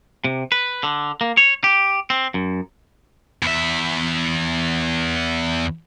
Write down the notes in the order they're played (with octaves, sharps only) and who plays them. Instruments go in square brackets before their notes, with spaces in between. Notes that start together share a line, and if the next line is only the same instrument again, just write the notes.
[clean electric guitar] C3
B4
D3
A#3
C#5
G4
C4
F#2
[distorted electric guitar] E2 E5